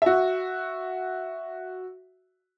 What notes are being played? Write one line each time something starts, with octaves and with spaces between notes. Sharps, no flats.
F#4 E5